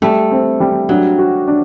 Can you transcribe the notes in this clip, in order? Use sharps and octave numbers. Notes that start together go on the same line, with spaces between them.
G3 A3
C4
G3
F#3 D4
F#4
D4